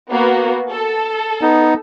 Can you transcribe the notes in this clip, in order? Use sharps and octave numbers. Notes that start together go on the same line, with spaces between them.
A#3 B3 F#4
A4
B3 D#4